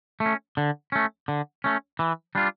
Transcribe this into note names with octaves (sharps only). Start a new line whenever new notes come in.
A3
C#4
D3
A3 C#4
D3
A3 C#4
E3
G3 D4 F4